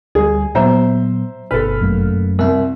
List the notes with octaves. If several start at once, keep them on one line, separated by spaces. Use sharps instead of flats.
D2 G3 G#4
A#2 F#3 B3 C5 E5 A#5
G1 B2 A4 B4 F6
F#2 A3 A#3
C2 A#4 E5